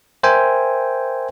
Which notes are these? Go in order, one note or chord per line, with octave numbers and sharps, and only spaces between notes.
A#4 C5 E5 G5 G#5